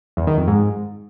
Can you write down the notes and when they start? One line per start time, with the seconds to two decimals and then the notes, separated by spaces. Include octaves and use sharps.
0.17 E2
0.27 D#3
0.37 F2
0.47 G#2